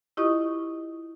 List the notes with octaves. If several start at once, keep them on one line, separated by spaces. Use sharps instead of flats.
E4 F4 G4 D#5 C#6 D#6